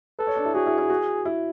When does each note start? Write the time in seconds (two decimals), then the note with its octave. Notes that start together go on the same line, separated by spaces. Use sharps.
0.19 A4 B4
0.27 C#5
0.36 D4
0.45 E4
0.54 F#4 G#4
0.66 E4
0.78 E4
0.90 F#4
1.25 E4